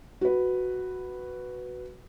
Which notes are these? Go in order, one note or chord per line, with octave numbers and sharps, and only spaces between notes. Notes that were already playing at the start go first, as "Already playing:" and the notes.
F#4 B4